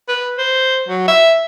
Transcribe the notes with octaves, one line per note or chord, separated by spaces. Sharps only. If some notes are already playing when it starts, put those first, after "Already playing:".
B4
C5
F#3
E5